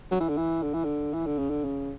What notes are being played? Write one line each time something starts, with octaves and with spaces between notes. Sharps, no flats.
F#3
E3
D3
E3
D3
E3
D3
E3
D3
C#3
D3
C#3